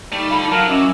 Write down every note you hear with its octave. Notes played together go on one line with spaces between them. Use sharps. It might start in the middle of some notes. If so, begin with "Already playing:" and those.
G3 A3 D#4
F4 A4 D5 F5 B5
F#3 A#4 F5 A5
C#4 E4 D#5 D6